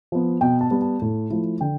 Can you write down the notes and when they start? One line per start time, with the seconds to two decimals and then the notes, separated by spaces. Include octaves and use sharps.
0.12 F3 B3
0.41 B2 G5
0.61 A5
0.71 G3 B3
0.82 A5
1.02 A2
1.30 F3 A3 E4
1.61 D3 G5